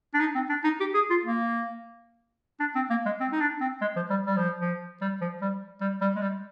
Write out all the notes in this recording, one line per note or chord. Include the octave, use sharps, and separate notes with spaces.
D4
D#4
C4
D4
D#4
G4
G#4
F4
A#3
D4
C4
A#3
G#3
C4
D#4
D4
C4
G#3
F3
G3
G3
F3
F3
G3
F3
G3
G3
G3
G#3
G3